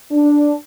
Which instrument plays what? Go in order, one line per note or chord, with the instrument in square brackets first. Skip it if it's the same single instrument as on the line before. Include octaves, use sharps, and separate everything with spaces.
[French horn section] D4